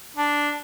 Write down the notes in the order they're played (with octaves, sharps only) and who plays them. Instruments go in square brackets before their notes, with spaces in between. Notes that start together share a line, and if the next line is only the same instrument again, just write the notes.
[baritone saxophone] D4